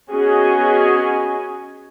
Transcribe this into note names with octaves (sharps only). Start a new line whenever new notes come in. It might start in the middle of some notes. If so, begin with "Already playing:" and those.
B3 C#4 F#4 G#4 D#5 G#5